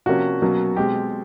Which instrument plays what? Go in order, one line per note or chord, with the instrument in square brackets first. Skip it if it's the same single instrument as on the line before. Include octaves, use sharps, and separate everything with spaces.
[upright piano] C3 F3 A#3 C#4 F#4
B2 F#3 A#3 C#4
B2 G#3 C4 G4